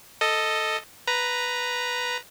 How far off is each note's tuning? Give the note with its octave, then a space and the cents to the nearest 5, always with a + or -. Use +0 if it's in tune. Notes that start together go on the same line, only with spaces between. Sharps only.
A4 +5 D#5 +0
B4 +0 A#5 +0